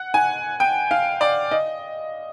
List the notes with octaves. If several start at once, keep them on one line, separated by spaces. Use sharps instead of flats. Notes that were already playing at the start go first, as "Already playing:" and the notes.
Already playing: F#5
G#5
G5
F5
D5
D#5